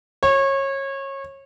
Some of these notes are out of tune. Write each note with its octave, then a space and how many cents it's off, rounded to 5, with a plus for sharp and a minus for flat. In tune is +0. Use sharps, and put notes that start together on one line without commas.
C#5 -25